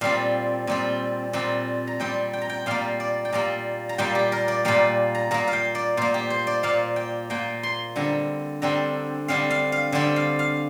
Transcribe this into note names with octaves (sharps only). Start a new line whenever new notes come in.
A#2 G3 C4 F5
A#2 G3 C4
A#2 G3 C4
A#5
A#2 G3 C4 G5
G5
A#5
G5
A#2 G3 A#3 F5
D5
G5
A#2 G3 A#3 A#5
A#5
A#2 G3 A#3 G5
G4
A#4
D5
A#2 G3 A#3 F5
A#5
A#2 A#3 A#5
F5
G5
D5
A#2 A#3 C5
G4
C5
D5
A#2 A#3 F5
G5
A#2 A#3 G5
C6
D3 G3 C4 A#5
D3 G3 C4 A#5
D3 G3 C4 F5
F5
F5
D3 G3 C4 D5
F5
F5